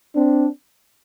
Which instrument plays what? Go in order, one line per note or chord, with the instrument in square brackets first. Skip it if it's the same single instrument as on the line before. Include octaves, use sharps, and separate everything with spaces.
[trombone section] C4 D4